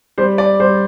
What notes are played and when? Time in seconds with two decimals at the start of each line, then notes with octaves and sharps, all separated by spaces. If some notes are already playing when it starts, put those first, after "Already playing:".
0.18 G3 C5
0.38 D5
0.60 G3 C5